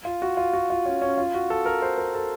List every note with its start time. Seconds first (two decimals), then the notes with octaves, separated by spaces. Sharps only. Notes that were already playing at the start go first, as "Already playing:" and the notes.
0.05 F4
0.22 F#4
0.37 F4
0.53 F#4
0.70 F4
0.86 C#4
1.02 C#4
1.18 F4
1.34 F#4
1.50 A4
1.65 A#4
1.82 C5
1.98 A#4
2.15 A4